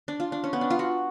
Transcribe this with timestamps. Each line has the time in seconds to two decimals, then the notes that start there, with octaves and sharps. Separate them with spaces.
0.08 D4
0.20 F4
0.32 D4
0.44 C#4
0.53 B3
0.61 D4
0.70 F4
0.79 F#4